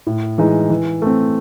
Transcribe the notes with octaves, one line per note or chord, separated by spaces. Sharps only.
A2
E3 G#3 D#4
E3
A3 C4